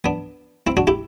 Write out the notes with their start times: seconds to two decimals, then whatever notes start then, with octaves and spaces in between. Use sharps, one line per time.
0.04 B3 D4
0.67 C4 E4
0.77 D4 F#4
0.87 E4 G4